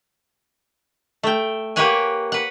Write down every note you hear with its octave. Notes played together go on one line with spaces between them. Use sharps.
A3 G5
A#3 G4 B4 C#5 F#5 G#5
B4 F#5